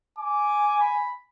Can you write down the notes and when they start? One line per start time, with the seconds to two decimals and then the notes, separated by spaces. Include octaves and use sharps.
0.19 G#5 D6
0.81 B5